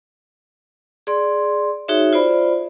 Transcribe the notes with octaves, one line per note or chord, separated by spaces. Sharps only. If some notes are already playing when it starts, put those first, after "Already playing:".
G#4 D5 C6
D#4 F#4 G#4 C#5 E5
F4 C5 D5 B5